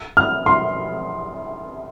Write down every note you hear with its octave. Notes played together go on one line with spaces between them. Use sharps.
F6
C6